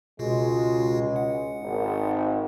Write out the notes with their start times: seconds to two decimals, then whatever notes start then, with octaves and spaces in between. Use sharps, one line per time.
0.19 C#2 B2 G#3 F4 F#4
1.16 F#5
1.61 G#1